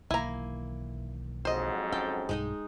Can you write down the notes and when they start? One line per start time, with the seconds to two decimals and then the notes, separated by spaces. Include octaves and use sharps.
0.11 B1 D#3 E3 A#3 E4 G#5 A#5
1.45 F2 G#2 F#3 C5 D#5
1.92 C#4 A4 G5
2.29 B1 G2 G#3 D#4 D#5